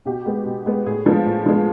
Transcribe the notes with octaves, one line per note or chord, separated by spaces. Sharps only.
B2 G4
G#3 B3
B2
G#3 B3
A2 G#4
F3 G#3 B3
A2
F3 G#3 B3